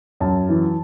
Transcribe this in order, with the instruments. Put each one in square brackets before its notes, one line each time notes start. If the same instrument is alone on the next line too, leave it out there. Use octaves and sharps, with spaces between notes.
[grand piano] F#2 A5
E3